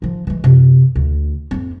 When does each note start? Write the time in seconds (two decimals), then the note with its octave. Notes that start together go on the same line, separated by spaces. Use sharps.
0.02 D#3 F3
0.27 E3 G#3
0.44 F#2 C3
0.96 D2
1.51 F2 C4